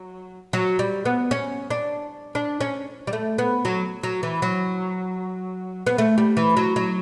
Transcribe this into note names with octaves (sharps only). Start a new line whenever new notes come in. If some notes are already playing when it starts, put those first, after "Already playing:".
Already playing: F#3
F#3
G3
B3
C#4
D4
D4
C#4
G3
A3
B3
F#3
F#3
E3
F#3
B3
A3
G3
E3
F#3
F#3